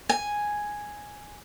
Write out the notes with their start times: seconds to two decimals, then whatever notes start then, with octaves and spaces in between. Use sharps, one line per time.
0.09 G#5